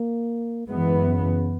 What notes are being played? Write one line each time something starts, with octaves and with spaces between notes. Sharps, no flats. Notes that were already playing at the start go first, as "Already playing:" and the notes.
Already playing: A#3
F#2 E3 G#3 B3
C#3